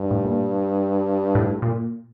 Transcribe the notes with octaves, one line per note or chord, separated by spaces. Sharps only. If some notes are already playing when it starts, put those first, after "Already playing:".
Already playing: G2
A2
A#2
A2
A#2